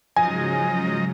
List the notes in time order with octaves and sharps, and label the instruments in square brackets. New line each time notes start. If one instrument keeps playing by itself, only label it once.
[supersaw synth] G#2 C#3 F#3 [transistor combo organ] F3 D#5 A#5 [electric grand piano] G#5